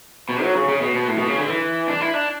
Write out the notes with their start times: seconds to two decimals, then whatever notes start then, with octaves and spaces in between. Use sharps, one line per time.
0.29 B2
0.42 F#3
0.54 C#3
0.69 C#3
0.81 B2
0.95 B2
1.08 A2
1.18 B2
1.27 C#3
1.38 D3
1.48 E3
1.88 D4
2.01 E4
2.14 D4